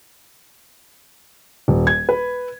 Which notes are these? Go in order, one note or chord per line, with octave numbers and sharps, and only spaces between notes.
D#1
G#6
B4